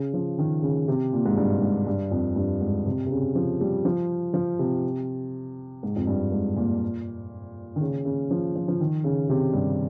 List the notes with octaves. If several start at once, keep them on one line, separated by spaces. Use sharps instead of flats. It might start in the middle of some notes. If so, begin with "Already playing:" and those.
Already playing: C#3
F3
D#3
C#3
C3
A#2
G#2
G2
G#2
G2
F2
G2
G#2
C3
C3
C#3
F3
G3
F3
F3
C3
G#2
F2
G2
G#2
A#2
D#3
C#3
C#3
F3
F3
F3
D#3
C#3
C3
G2